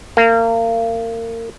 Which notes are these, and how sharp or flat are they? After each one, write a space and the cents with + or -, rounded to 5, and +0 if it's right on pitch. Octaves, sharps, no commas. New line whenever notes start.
A#3 -30